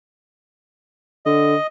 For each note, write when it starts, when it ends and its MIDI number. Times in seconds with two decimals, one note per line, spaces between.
1.26 1.55 50
1.26 1.67 75